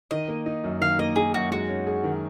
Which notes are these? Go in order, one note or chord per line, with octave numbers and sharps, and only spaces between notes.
D#3 D#5
A#3
D#4
F#2
D#3 F5
A#3 D#5
D#4 G#4
F#2 F#4
G#3 F#4
C#4
G#4
D#3